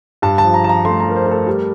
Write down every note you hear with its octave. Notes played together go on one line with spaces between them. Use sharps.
G2 A5
A5
F3
A#5
F3 A5
A#5
A3 C6
A#5
F3 A#4
C5
A3
A4
G3 A#4